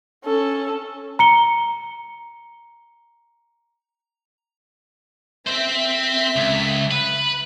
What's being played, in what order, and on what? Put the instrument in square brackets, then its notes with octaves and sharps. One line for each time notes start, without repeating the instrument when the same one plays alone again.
[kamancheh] C#4 A4
[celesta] A#5 C#7 G7
[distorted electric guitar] C4 C5 [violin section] E5 B6
[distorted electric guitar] C#2
B4